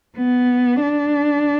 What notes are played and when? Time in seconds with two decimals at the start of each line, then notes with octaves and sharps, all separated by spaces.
0.17 B3
0.82 D4